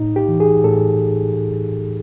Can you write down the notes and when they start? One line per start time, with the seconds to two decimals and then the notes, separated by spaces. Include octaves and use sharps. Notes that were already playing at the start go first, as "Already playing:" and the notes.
Already playing: A2 D#4
0.16 G4
0.28 E3
0.40 G#4
0.64 A2 A4